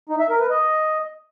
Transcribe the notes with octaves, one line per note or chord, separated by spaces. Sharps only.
D#4
E5
A#4
B4
D#5